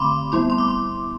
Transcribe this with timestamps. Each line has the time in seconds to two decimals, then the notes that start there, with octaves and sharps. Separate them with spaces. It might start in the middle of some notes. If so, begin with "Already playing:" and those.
Already playing: D3 A3 C4 B5 C6 D6
0.32 G3 B3 E4 C6
0.50 C6
0.58 D6
0.68 C6